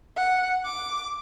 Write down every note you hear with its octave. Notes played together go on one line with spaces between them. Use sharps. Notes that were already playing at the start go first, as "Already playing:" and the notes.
F#5
D6